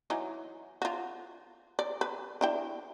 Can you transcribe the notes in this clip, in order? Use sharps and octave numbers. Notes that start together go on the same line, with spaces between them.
E3 F#3 D#4
F4 F#4
D5
B4
D4 E4 G5